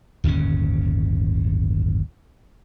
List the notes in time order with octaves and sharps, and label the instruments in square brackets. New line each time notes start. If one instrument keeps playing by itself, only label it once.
[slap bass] D1 G1 D#2 C#4